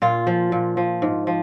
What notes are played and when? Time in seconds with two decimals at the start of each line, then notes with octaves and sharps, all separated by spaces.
0.02 A#2 F4
0.27 F3
0.52 A#2
0.77 F3
1.02 G#2
1.27 F3